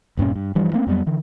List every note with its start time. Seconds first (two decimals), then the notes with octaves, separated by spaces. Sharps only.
0.17 E1 G2 A#2 C#4
0.36 G2
0.55 G2 E3 F3 G3
0.73 A3 A#3 C4 C#4
0.87 F2 F#3 G3 B3
1.06 D3 E3